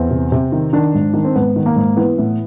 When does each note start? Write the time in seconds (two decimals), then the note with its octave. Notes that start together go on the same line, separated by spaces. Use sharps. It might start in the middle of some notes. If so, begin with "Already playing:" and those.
Already playing: E2 C4
0.11 C3
0.32 C3
0.52 D#3
0.73 D#3 D4
0.94 G#2
1.14 D#3
1.24 C4
1.35 G#2 B3
1.56 D#3
1.66 A#3
1.76 G#2
1.96 E3 B3
2.18 A2